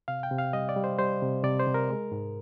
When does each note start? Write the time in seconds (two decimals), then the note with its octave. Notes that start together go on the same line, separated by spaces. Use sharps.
0.08 C3 F5
0.23 G5
0.31 C3
0.38 F5
0.53 G3 D#5
0.69 D5
0.77 G3
0.84 C5
0.98 G3 C5
1.22 C3
1.44 C3 D5
1.60 C5
1.67 C3
1.74 A#4
1.90 G#3
2.12 G#2